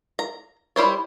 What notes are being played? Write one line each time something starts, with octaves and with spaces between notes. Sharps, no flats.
A#5
G3 E4 C5 C#5